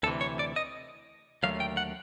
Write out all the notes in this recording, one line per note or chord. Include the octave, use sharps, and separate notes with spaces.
D2 C3 E3 A4
C#5
D5
D#5
D#2 D3 F#3 A3 F5
G5
F#5